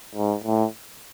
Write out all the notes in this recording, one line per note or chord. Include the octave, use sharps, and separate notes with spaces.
G#2
A2